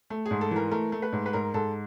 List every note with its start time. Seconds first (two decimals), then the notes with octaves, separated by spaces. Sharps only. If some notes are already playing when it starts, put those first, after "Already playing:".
0.10 A3
0.26 G#4
0.31 G#2
0.41 A4
0.51 E3 A#4
0.71 A3 A#4
0.92 A3
1.02 B4
1.12 G#2
1.26 B4
1.33 G#2 A#4
1.54 G#2 A4